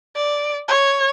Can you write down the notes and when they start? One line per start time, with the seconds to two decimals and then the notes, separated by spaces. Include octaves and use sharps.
0.16 D5
0.68 C#5